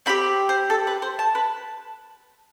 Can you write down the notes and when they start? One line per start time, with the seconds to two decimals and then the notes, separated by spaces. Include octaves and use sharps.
0.06 C4 E4 G4 B5
0.49 C5
0.70 A4
0.87 B4
1.02 C5
1.19 A5
1.35 B4